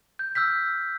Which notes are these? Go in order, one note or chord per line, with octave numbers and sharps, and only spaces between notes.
G6
E6 F6 G6 B6